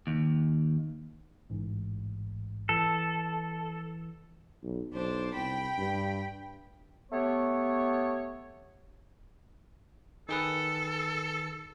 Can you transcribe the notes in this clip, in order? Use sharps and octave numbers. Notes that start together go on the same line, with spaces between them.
D#2
A1 G#2
E3 A4
B1
B1 D4 C5
C2 G5 B5
G2
A3 B3 G4 C#5
D#3 G#4 A4 B4